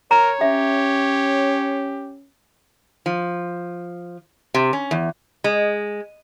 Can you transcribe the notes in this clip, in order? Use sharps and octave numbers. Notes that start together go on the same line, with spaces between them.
A#4 C#5 A#5
C#4 G4 E5
F3
C3
C#4
E2
G#3